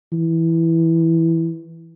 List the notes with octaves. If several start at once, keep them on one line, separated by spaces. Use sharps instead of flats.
E3